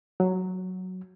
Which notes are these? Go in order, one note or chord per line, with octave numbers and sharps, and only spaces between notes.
F#3